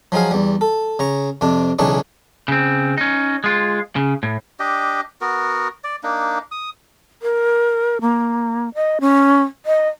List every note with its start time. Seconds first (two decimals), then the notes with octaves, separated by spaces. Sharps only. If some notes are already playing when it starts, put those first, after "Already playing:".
0.12 F3 F#3 D#4 G#4 F5
0.31 E2 G3
0.61 A4
0.99 C#3 A#5 C#6
1.41 F2 C3 D4
1.79 B1 C#3 E3 D4 D#4 C#6
2.48 C#3 C4
2.98 C#4 D#4
3.44 G#3 F4
3.96 C#3
4.23 A2
4.59 D4 G4 D#5
5.21 B3 F#4 A#4
5.84 D5
6.03 A#3 D4 D#4
6.51 D#6
7.22 A#4
8.01 A#3
8.75 D#5
9.01 C#4
9.66 D#5